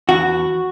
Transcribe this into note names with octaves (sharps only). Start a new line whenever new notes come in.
E2 F#4